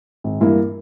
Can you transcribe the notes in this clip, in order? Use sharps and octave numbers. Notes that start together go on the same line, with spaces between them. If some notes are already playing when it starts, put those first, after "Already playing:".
G#1
G2 E3 A#3 E4